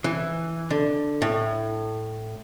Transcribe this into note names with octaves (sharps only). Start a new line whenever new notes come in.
E3
D3
A2